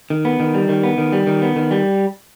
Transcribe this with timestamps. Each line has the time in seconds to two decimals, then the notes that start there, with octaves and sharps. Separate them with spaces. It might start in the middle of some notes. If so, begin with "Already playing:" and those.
0.10 D#3
0.25 B3
0.40 D#3
0.54 G3
0.69 D#3
0.83 B3
0.98 D#3
1.12 G3
1.27 D#3
1.42 B3
1.56 D#3
1.71 G3